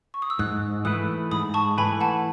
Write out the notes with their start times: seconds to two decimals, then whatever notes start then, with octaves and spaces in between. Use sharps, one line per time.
0.14 C#6
0.22 D#6
0.30 E6
0.39 G#2 D#6 F#6
0.85 E3 A3 E4 B4 D#6 F#6
1.31 G#2 B5 D#6
1.54 A5 C#6
1.78 E3 A3 E4 B4 G#5 B5
2.01 F#5 A5